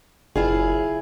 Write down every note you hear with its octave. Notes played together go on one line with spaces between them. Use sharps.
F#1 E4 F4 G#4